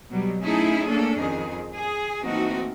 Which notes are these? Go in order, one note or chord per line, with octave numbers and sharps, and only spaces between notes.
B2 F#3 G3
A3 C#4 D#4 E4 G#4 A4
A3 A#3 C#4 D4 A4
F2 D#3 G#4
G#4
E3 A3 A#3 C4 D#4 F#4